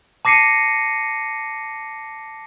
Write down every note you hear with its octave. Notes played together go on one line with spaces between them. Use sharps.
A5 D6 A#6 C7 C#7 D#7